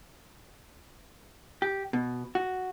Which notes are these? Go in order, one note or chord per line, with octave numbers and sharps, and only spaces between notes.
G4
B2
F#4